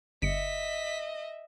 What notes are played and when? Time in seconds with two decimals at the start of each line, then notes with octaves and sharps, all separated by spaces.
0.22 G1 D#5 E5 B6 C#7